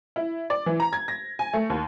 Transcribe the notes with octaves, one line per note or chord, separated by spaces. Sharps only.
E4
D5
E3
A#5
G#6
A#6
G#5
A3
D#2